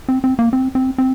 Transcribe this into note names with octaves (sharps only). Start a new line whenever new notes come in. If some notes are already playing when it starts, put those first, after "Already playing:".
C4
C4
A#3
C4
C4
C4